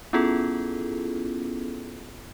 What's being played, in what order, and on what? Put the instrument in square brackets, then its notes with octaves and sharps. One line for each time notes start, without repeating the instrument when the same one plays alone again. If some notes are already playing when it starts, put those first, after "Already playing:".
[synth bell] B3 C#4 E4 F4 G#4 A4